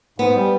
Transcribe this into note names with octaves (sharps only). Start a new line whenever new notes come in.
G#2 B3
G3